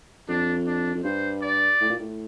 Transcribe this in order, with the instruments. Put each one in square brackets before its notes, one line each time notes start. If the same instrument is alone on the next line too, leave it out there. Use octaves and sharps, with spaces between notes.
[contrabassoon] F2 [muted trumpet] D4
[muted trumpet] D4
[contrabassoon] F2
[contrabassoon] G2 [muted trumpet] C5
[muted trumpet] D5
[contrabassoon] A2
A#2
A2